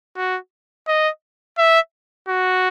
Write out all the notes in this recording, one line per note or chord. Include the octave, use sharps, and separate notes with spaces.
F#4
D#5
E5
F#4